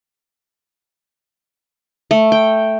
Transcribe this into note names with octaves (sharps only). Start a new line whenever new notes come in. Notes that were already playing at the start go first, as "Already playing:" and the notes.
A3
G5